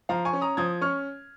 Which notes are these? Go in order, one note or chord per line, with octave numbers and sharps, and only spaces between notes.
F3 F5 A#5
G#5 C#6
C#4
A#5 D#6
F3 D#6 G#6
C#4 C#6 F6